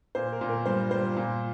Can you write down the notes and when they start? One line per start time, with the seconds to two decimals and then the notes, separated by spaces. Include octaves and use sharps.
0.15 A#2 C5
0.32 A#4
0.41 A#2
0.49 A#4
0.66 G2 C5
0.91 G3 C5
1.17 A#2